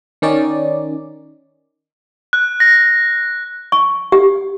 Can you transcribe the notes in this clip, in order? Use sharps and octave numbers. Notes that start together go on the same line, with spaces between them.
D#3 C#4 D#4 D5
F#6
A#6
C#6
G4